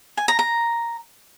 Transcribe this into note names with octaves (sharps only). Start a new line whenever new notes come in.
G#5
A#5
A#5